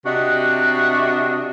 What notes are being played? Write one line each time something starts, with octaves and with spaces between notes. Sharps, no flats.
C3 D4 F#4 D#5 E5